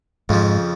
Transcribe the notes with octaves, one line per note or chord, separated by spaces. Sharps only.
F2 G#2 C#3 F3